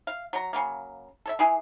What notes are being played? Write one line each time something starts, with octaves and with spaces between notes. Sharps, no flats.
F5
F#3 A#5
C#3 F#3 A#3
A4 C#5 E5
E3 E4 G#4